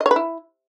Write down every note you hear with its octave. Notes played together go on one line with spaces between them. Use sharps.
D#5
C#5
B4
E4